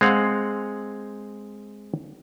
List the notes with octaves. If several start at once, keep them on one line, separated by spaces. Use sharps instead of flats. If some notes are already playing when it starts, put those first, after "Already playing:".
G#3 C4 F5 F#5